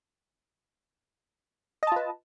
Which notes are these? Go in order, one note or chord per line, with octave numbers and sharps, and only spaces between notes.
F4 B4 D#5 A5